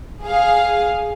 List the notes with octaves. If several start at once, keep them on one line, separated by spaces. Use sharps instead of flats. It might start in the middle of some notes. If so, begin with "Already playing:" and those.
G#4 F5